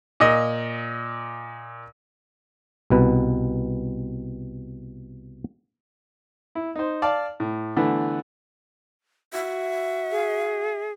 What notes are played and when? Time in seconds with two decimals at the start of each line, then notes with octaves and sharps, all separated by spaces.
0.20 A#2 D#5
2.90 C2 B2 B4
6.55 E4
6.76 D#4 C5
7.02 D5 F5 A5
7.40 A2
7.77 D3 E3 A3 B3
9.33 F#4 E5
10.11 G#4